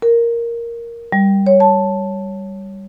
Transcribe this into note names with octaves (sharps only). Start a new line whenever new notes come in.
A#4
G3
C#5
A5